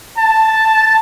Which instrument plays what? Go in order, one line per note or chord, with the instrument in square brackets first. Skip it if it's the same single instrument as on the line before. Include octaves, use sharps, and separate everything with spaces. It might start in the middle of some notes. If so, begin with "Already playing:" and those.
[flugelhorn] A5